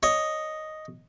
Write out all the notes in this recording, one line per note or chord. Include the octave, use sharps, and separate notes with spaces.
C#5 D#5